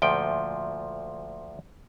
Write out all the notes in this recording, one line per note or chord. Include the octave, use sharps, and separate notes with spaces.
D2 A#2 F3 G5